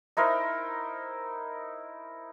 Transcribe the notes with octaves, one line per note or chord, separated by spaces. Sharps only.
D#4 E4 A#4 C5